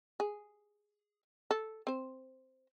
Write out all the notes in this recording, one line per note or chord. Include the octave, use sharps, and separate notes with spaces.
G#4
A4
C4 C5